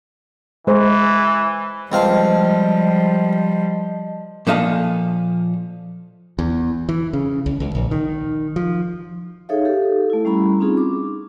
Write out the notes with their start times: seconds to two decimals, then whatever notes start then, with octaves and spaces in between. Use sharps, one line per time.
0.67 E3 G#3 C5
1.92 C#2 F3 G3 C4 D#5 F5 A5
4.47 A#2 F3 A4 D#5 F5 A5
6.39 E2
6.89 E3
7.13 C#3
7.46 C#2
7.60 C#2
7.75 A#1
7.91 D#3
8.56 F3
9.49 D#4 G#4 A4 C#5 E5 F5
9.65 G4 A4 F5
10.10 A3 E4
10.25 G3 C#4 E4 A#5 B5
10.60 C4 C#4 D#4 F4 G#4
10.77 D6